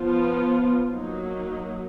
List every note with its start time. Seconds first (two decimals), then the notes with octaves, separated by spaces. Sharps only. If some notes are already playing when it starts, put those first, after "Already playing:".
Already playing: F3 B3 F4
0.91 F#3 A#3 D#4